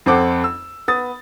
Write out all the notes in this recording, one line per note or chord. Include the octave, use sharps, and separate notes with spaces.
F2 C4 A4 C5 F#5 D6
E6
B3 D#6 A6